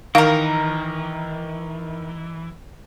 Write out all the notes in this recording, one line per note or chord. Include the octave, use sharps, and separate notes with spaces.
D#3 E3 D#4 A#4 F5